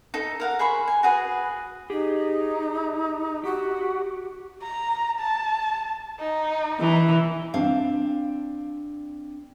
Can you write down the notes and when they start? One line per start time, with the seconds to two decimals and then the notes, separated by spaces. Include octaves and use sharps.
0.14 D#4 A4
0.40 A#4 F5 F#5
0.59 G#4 C5 B5 C#6
0.88 G#5
1.03 F#4 G#4 B4
1.90 D#4 G4 G#4
3.44 F#4 G4
4.62 A#5
5.20 A5
6.20 D#4
6.80 E3
7.54 C4 D4 F5 G5